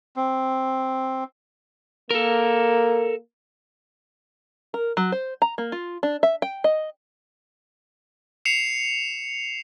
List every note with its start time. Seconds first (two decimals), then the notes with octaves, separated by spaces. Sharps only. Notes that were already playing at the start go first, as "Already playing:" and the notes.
0.16 C4
2.11 A#3 A4 A#4
4.74 A#4
4.97 F#3
5.12 C5
5.42 A#5
5.58 A#3
5.72 F4
6.03 D4
6.23 E5
6.42 G5
6.64 D#5
8.45 C7 C#7 E7 F7